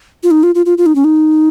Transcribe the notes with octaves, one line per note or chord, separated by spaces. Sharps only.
F4
D#4
F4
F4
F4
F4
D#4
C#4
D#4